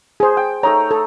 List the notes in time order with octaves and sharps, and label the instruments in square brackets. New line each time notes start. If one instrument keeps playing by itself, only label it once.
[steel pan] G#4 C5
[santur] G5
[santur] A3 D#4 A#5 [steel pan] C#5
[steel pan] A4